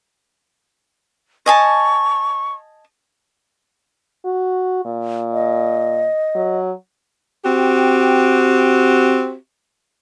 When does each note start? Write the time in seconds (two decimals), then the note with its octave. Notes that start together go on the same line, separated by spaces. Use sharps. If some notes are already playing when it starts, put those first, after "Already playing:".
1.46 D#5 G#5 A5 C#6
4.25 F#4
4.85 A#2
5.33 D#5
6.35 F#3
7.45 C4 F#4 G4